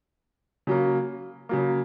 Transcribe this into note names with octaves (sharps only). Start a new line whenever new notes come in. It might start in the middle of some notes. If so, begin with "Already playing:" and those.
C#3 F#3 A#3
C#3 F#3 A#3